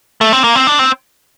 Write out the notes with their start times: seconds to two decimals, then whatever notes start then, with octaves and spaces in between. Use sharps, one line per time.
0.21 A3
0.33 C4
0.44 A#3
0.55 C4
0.67 D4
0.79 C4